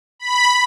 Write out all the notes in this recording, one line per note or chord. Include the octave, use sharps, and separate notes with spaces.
B5